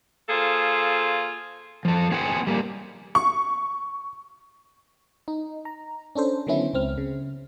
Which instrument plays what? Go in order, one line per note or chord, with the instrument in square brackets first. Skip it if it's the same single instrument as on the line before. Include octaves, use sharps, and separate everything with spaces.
[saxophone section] A#3 F4 G#4 A4 C5
[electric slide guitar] F3 A4
B3 G#4 C5 F#5 G5
G3 A#3
[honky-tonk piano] C#6
[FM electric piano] D#4
A#5
C#4 D4 A4 C5
D3 D#3 F#3 B3 C#4 E4
C#2 C4 F6
C#3